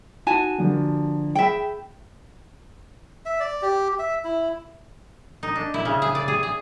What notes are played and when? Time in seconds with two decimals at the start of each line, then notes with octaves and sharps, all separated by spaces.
0.27 D#4 F#4 G#5 A5
0.58 D3 F3 A#3
1.35 G#4 E5 G5 B5
3.25 E5
3.40 D5
3.62 G4
3.99 E5
4.24 E4
5.43 D#4
5.56 D4
5.74 E4
5.85 C#3
6.02 G#4
6.15 D5
6.28 G#4
6.43 G#4